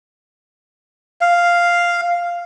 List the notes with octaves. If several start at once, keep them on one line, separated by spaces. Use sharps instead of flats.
F5